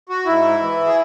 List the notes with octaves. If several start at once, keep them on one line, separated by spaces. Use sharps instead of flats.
F#4
G#2 E4
E3
G#4